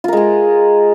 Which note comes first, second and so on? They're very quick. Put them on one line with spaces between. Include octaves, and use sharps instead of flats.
F4 A#4 G#3 G#4